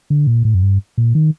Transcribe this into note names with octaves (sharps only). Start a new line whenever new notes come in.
D3
A#2
A2
F#2
G2
A#2
D#3